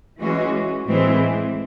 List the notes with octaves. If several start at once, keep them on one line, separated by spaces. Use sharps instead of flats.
E3 G#3 C#4 F#4
A2 E3 G#3 C4